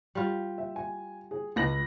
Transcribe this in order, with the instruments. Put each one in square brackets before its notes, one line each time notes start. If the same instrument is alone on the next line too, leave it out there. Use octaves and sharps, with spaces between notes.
[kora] G3 F4
[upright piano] E5
G#5
G#4
[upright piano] C#2 A#6 F#7 [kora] B4